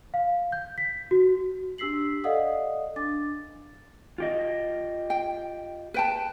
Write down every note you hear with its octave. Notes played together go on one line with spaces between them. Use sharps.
F5
G6
B6
F#4
D4 G4 E6 B6 C7 F#7
A4 D5 D#5 F5 F#5 D#6
D4 D6 A6
F4 G4 D#5
G5
B4 G5 A5